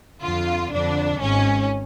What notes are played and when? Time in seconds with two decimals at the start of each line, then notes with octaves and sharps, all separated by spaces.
0.23 F2 D3 F4
0.72 F2 D3 D4
1.20 G#1 G#2 C#4